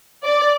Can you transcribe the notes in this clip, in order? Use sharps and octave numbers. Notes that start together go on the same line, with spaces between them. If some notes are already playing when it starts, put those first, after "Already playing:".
D5